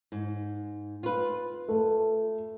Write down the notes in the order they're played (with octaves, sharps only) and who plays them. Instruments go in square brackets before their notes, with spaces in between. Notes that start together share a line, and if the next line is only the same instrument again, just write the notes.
[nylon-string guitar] G#2
F4 B4
[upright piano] A3